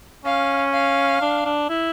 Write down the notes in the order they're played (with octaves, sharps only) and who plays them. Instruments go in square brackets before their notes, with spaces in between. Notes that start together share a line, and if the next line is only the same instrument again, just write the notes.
[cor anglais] C#4 [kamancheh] F5
[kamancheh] F5
[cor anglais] D4
D4
E4